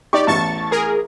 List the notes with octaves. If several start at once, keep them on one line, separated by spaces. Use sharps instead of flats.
D#4 G4 D5 C#6
A1 E2 A5 C#6 A6
G#4 A#4